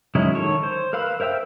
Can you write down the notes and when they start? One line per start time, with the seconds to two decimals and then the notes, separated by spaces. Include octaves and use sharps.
0.15 D#3 F#3 G#3 C#4 E4
0.35 D#3 A4 C#5
0.63 C5
0.93 A#4 B4 F5 B5 E6
1.20 A#4 C5 E5 G5 E6